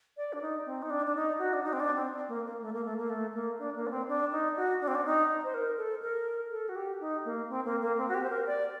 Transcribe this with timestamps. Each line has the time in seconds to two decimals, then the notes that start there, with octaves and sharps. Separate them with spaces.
0.17 D5
0.33 D4
0.41 D#4
0.66 C4
0.82 D#4
0.90 D4
1.06 D4
1.15 D#4
1.39 F#4
1.53 D4
1.63 D#4
1.73 C4
1.80 D4
1.96 C4
2.28 A#3
2.45 A#3
2.62 A3
2.73 A#3
2.85 A3
2.98 A#3
3.10 A3
3.34 A#3
3.59 D4
3.75 A#3
3.87 D4
3.91 C4
4.08 D4
4.32 D#4
4.56 F#4
4.81 D4
4.88 C4
4.95 D4
5.06 D#4
5.44 C5
5.54 A#4
5.78 A4
6.02 A#4
6.52 A4
6.69 F#4
6.76 G4
7.00 D#4
7.25 A#3
7.49 C4
7.65 A#3
7.81 A#3
7.98 C4
8.09 F#4
8.14 G4
8.23 C5
8.30 A#4
8.46 D5